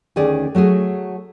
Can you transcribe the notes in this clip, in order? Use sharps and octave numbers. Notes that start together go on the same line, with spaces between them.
D2 D#3 C#4 G#4 D5
F#3 A3 F#4 G#4